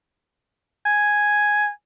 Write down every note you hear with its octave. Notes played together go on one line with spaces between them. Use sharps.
G#5